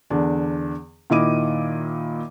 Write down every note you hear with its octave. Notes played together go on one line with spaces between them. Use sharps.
E2 D3 D4
A#2 D#3 E4 D#5 D6 D#7